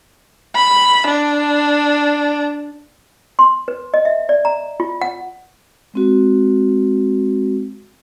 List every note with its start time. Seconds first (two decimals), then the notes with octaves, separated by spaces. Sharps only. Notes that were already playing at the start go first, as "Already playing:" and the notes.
0.55 B5
1.08 D4
3.39 C6
3.68 B4
3.94 D#5
4.05 E5
4.29 D5
4.45 A#5
4.80 F4
5.01 F#5
5.94 G#3 C4 F#4